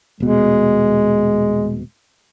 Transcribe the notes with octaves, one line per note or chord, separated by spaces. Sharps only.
D#1 B2 G#3